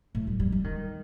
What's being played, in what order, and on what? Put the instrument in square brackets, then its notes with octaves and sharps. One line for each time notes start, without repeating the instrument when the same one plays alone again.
[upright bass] A2
G3
G3
G3
D#3